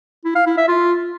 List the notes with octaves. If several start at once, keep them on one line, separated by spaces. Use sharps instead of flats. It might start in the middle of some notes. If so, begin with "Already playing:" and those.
E4
F5
E4
E5
F4